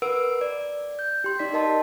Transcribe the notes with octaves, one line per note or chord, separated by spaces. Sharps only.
A#4 B4 F#5 E6 D7
D5
G6
G4 C6
D#4 D5 B6
A#4 D#5 A5 C6